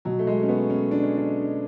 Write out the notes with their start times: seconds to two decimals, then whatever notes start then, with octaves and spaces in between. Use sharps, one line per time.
0.05 B2 F#3
0.19 A3
0.27 G#3
0.43 C#4
0.48 B3
0.70 C#4
0.91 D4
1.03 C#4
1.17 D4